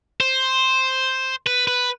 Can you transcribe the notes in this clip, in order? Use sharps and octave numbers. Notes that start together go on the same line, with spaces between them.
C5
B4
B4